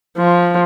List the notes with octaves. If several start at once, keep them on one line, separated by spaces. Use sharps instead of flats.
F3